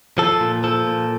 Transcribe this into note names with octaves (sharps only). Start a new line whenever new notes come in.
F3 A4
A#2
F3 A4
A#2